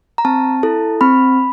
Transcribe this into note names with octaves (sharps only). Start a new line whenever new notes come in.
A#5
C4 A5
E4 A4
C4 B5